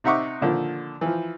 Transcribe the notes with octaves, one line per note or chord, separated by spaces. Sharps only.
C3 D#4 E5 F#5 C#6 D6
A#2 D3 D#3 F3
E3 F3